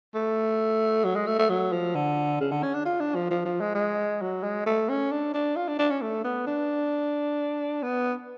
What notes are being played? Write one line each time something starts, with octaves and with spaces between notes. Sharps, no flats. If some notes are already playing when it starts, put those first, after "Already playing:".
A3
F#3
G#3
A3
A3
F#3
F3
D3
C#3
D3
C#4
D4
F4
D4
F3
F3
F3
G#3
G#3
F#3
G#3
A3
C#4
D4
D4
F4
D4
D4
C#4
A3
B3
D4
B3